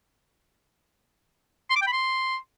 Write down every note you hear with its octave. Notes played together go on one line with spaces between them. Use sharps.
C6
D6
G5
B5
C6